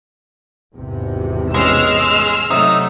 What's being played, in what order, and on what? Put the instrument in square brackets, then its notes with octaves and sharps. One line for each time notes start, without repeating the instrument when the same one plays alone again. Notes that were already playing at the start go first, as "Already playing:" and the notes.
[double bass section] G#1 E2 C3
[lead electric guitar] G#3 [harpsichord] B3 C#4 G5 [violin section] E6 F6
[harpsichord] C3 F#3 A3 [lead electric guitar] D#4